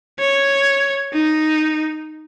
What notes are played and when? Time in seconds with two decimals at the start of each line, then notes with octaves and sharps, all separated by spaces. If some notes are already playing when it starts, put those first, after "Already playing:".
0.19 C#5
1.13 D#4